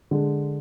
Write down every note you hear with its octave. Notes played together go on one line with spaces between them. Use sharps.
D3 G#3